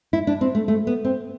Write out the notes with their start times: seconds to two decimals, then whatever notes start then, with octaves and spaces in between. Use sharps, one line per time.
0.13 E4
0.27 D4
0.41 C4
0.55 A3
0.68 A3
0.87 B3
1.05 C4